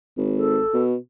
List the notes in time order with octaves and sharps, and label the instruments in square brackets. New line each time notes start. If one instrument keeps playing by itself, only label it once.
[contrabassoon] G#1
[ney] A4
[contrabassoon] B2